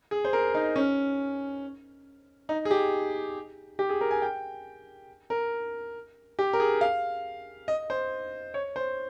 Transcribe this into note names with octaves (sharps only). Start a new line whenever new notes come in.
G#4
C5
A#4
D#4
C#4
D#4
G#4
G4
G4
G#4
A#4
G#5
G5
A#4
G4
A#4
G#4
F5
D#5
C5
C#5
C5